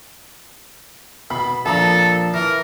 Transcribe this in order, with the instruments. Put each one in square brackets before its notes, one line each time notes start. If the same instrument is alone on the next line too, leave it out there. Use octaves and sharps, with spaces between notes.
[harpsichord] B2 [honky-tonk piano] B5
[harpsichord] A#1 F3 [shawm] A4 [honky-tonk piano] A5 A#5
[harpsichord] E3 [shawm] A#4